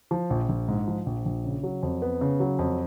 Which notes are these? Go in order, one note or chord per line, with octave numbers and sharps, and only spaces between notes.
F3
A#1
A#1
G#2
F3
A#1
A#1
C#3
F#3
F2
B3
C#3
F#3
F2